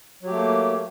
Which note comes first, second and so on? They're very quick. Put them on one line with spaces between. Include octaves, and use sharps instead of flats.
F#3 G4 A3 A#3